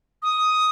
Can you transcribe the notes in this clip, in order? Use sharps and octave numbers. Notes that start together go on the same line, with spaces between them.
D#6